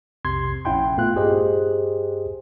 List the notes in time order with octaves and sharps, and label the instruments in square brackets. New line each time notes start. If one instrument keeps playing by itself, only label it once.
[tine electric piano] B1 F2 C3 C6 G#6 C7
A#1 C#4 E4 F#5 G5 C6
A#2 A3 B3 F4 F#6
G2 G4 G#4 C5 D#5